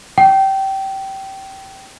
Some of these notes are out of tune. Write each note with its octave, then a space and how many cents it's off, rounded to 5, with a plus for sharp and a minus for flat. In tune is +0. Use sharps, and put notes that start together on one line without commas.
G5 -20